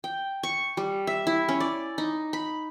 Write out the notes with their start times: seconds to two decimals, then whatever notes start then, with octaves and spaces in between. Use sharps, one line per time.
0.04 G5
0.43 C#6
0.77 G3
1.07 E5
1.27 E4
1.49 C#4
1.60 D5
1.98 D#4
2.33 B5